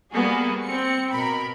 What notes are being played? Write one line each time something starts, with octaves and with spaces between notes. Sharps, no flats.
G3 A#3 B3 F#4 G#4
C4 C#7
B2 A#4 B5